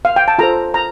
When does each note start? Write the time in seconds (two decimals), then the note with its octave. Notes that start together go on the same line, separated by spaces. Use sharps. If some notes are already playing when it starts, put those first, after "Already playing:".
0.05 F5
0.16 G5
0.28 A5
0.38 F4 A4 C5 A#5
0.74 A#5